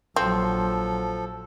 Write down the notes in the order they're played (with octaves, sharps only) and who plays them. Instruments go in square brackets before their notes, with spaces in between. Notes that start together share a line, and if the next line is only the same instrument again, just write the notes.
[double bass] A#1 F#3 [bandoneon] F3 A4 [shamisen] C4